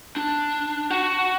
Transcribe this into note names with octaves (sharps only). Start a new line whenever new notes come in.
D4
F#4